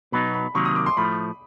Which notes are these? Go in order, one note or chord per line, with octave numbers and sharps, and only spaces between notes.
B2 F#3 B3 D#4 B5
B5
C3 D#3 F#3 A#3 C#6
D#6
D6
C6
A2 F3 A3 B5